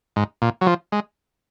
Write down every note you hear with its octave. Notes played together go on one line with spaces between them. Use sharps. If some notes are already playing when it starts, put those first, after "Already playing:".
G#2
A#2
F#3
F3
G#3